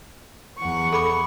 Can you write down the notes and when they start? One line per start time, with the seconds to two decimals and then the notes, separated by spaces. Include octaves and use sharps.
0.57 E2 F#5 C#6
0.92 A4 B5 D6